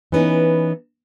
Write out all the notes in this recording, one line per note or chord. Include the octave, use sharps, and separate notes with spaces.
E3 B3 C#4 D#4